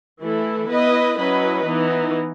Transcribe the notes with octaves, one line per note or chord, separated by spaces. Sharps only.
E3 A3 E4 A4
B3 E4 B4 D#5
F#3 C#4 E4 B4 D#5
E3 B3 D#4